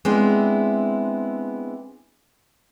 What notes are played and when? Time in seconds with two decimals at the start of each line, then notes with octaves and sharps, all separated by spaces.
0.05 G#3 B3 C4 D4 E4